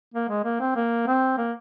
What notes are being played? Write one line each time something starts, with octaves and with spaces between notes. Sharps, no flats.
A#3
G#3
A#3
C4
A#3
C4
A#3